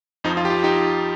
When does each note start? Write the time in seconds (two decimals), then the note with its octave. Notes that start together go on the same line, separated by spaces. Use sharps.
0.24 F2 F3 D#4
0.37 F4
0.45 G4
0.50 F4
0.64 D#4 G4